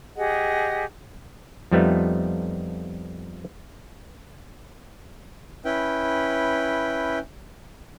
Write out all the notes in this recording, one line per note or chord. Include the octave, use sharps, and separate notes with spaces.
G4 G#4 D#5 F#5
F2 F3 G3 A3 B3 D#4
C#4 E4 B4 G5